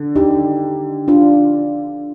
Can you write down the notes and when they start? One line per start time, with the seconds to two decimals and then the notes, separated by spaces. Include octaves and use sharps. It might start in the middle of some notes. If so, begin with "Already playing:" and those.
Already playing: D3
0.16 D#4 G4
1.08 D4 F4